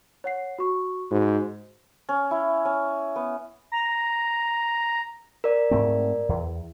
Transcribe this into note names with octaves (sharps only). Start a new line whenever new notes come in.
C#5 F#5 C7
F#4 C#6
G#2 F#4
C#4
E4
C#4
B3
A#5
A#4 D5
G#2 A3 C4
E2